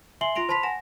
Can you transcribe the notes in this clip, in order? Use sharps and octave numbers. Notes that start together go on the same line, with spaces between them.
E5 G#5 C6 C7 F#7 G7
F4 C6 A#6 D7 F7
C5 A5 B5 C6 B6 F7
F#5 G#5 A#6 E7